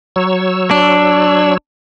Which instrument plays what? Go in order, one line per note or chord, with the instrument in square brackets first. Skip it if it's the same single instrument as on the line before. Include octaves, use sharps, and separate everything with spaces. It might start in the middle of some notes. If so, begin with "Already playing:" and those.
[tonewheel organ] F#3 C#5 E6
[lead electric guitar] D4